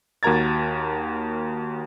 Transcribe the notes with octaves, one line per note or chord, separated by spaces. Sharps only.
D#2 F#4 A#4 A#5 G#6 A6